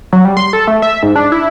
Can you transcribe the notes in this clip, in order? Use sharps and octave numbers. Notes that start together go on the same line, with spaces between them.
F#3
G3
C6
A4
A3
E5
G#2
D4
E4